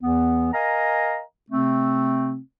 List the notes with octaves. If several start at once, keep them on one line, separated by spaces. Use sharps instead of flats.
E2 E3 B3
A#4 D#5 F5 G#5 A#5
C3 A3 C4